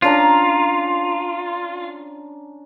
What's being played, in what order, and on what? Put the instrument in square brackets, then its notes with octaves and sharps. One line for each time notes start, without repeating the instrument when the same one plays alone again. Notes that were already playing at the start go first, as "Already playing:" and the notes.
[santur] C#4 D4 A#5 [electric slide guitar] F4